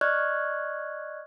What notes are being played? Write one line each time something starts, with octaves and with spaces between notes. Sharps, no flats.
D5 D#5 C#6 F6 F#6 G#6